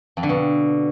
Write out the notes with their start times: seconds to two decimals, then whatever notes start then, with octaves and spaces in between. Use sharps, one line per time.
0.17 F2
0.23 D3
0.29 B2